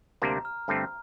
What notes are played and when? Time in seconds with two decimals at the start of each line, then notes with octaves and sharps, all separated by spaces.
0.22 D2 C3 G3 A#3 D4 A#5
0.45 F6
0.68 G2 D3 A3 C4